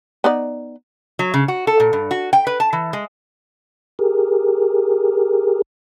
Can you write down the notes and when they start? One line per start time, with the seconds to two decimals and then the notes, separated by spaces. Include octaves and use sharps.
0.24 B3 D#4 D5
1.19 F#3
1.34 C#3
1.48 F#4
1.67 A4
1.80 A#2
1.93 G2
2.11 F#4
2.33 G5
2.47 B4
2.60 A5
2.73 E3
2.93 G#3
3.99 G4 G#4 A#4